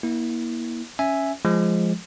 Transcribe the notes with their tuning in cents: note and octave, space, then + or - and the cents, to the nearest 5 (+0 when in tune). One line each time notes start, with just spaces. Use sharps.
A#3 +35 E4 -25
C#4 +0 E5 +0 G#5 +0
F3 +0 G#3 +0